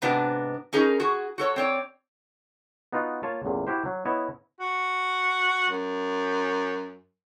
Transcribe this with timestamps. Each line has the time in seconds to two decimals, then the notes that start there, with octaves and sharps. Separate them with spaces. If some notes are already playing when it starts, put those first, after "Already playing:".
0.02 G#2 C3 B3 D4 F#4
0.73 C#4 D#4 G#4 A#4
1.00 F#4 G#4
1.38 F#4 A4 C#5
1.56 C4 C#5 D5
2.93 B3 D#4 F4 F#4
3.23 A#3 F4 C#5 A5
3.45 A1 E2 A#2
3.67 E4 F#4 G4 C5
3.85 F#3
4.05 B3 E4 C#5 D#5
4.60 F#4
5.70 F#2